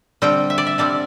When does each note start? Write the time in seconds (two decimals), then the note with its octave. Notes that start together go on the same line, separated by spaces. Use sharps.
0.22 D3 G3 C4 G5
0.50 E5
0.58 D5
0.67 E5
0.78 D3 G3 C4 D5